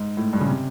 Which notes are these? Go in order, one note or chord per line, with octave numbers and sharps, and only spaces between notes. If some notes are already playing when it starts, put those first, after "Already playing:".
Already playing: G#2
A2
G2
C#3
C3